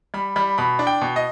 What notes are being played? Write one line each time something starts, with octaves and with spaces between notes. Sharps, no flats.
G3 B5
G3 B5
B2 B5
D4
G5
B2
D#5